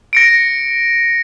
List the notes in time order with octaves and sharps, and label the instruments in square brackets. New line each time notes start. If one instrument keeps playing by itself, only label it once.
[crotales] A#6 C#7 D7